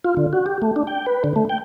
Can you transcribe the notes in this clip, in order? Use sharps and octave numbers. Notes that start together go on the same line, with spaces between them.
F4
D3
F#4
G4
A3
D4
G5
B4
D3
A3
G5